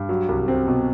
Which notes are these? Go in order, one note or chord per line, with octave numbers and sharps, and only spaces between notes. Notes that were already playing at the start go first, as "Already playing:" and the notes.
Already playing: G2
F#3
C2
C4
B2